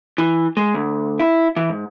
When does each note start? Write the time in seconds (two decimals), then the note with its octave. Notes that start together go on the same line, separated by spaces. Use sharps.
0.18 E3
0.57 G#3
0.74 D2
1.20 E4
1.56 E3
1.69 G#2